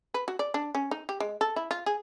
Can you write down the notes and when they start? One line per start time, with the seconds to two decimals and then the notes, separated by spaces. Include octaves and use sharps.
0.14 B4
0.28 F#4
0.39 D5
0.54 D4
0.75 C#4
0.91 D#4
1.09 G4
1.20 G#3
1.41 A4
1.56 E4
1.71 F4
1.86 G#4